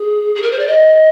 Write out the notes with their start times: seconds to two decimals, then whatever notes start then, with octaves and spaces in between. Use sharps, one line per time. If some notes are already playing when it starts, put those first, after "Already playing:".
Already playing: G#4
0.35 G#4
0.42 A#4
0.52 C5
0.59 D5
0.68 D#5